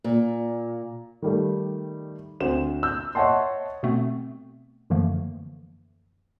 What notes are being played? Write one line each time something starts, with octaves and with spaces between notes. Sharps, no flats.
A#2
D#3 G3 A3
D2 C4 E7
E6 G6
C#5 D#5 E5 F#5 A5 C6
B2 A3 B3 C4
F#2 D3 E3 F3 A3 A#3